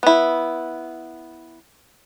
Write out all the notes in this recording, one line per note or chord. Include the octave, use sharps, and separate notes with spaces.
B3 E4